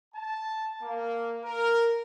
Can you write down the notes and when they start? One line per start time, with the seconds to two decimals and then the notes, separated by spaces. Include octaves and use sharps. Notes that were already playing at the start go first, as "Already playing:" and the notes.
0.15 A5
0.82 A#3
1.44 A#4